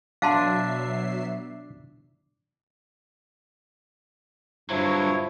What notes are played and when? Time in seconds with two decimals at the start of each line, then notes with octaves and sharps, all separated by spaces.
0.22 B2 F#3 D4 E5 F5 A5 C6 C7
4.70 G2 D3 F3 F#3 E4 C#5